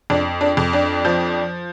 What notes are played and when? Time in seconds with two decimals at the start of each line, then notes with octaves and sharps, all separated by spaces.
0.10 F2 D4
0.41 D4
0.57 F2
0.73 D4
1.05 F3